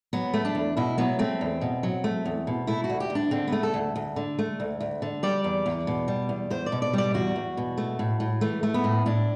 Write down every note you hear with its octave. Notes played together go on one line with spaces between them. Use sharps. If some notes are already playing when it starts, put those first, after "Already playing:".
F#3 B3
A3
D4
E2
B2 E4
F#3 B3
A3 C4
E2
B2
F#3
A3
E2
B2
A3 E4
F#4
D2
G4
D2
D4
D3 C4
A3 B3
A4
D2
D2
D3
A3
D2
D2
D3
G3 D5
E2
E2
B2
G3
E2
E2 C5
D5
B2
D5
G3 D5
E2 F#4
E2
B2
A3
A2
A2
E3 A3
A3
B3
A2
A2 D4